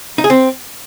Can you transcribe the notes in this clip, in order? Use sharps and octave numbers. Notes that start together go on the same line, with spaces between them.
D#4
G#4
C4